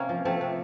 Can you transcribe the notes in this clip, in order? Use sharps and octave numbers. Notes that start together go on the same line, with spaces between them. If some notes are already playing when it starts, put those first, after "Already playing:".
Already playing: C3 A#3 C#4
F3
F3 A3 C4
C3